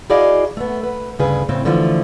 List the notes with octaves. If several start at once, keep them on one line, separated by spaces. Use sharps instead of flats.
E4 F#4 G#4 D5 D#5 F5
A3 B3
B4
D2 G2 C#3 G#4 B4
A2 C#3 C4
D3 E3 F3 A3 F4